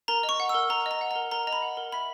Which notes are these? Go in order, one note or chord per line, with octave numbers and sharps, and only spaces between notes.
A#4 A#5
D#5
C#6
F#5
E6
A#4
A#4 A#5
D#5 A#5
F#5
A#4 A#5
A#4 A#5
D#5 A#5
B5
F#5
A#4
E5 B5